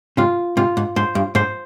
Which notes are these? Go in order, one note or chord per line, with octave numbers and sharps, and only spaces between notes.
G#2 C3 F4
G#2 C3 F4
G#2
G#2 C5
G2
G#2 C5